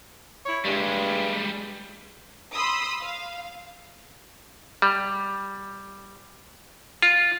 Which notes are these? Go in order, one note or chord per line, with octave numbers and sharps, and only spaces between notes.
E4 C#5
G2 G3 G#3
B5 C6 D#6 E6
F5
G3
F4